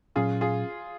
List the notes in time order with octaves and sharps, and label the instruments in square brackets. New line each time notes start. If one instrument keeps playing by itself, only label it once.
[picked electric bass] A#2 F#3 C#4 [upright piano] F4 G#4
[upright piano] F4 G#4